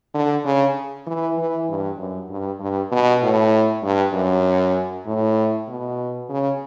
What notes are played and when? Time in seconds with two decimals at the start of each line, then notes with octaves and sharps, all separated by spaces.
0.14 D3
0.45 C#3
1.07 E3
1.38 E3
1.69 G2
1.98 F#2
2.30 G2
2.60 G2
2.92 B2
3.22 A2
3.83 G2
4.14 F#2
5.06 A2
5.69 B2
6.29 C#3